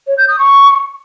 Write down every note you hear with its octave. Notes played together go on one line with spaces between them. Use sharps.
C#5
G6
D#6
C#6